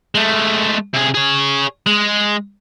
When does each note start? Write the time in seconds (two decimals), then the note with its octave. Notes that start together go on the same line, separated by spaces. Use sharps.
0.15 G#3 A3
0.93 C3 G#4
1.14 G#4 C#5
1.86 G#3